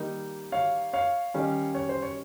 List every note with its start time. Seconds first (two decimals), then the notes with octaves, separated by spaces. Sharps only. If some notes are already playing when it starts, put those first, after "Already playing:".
Already playing: D#3 G3 A#3 D#4
0.52 C#5 F5
0.93 C#5 F5
1.34 D#3 G3 C#4
1.75 C#5
1.89 C5
2.02 C#5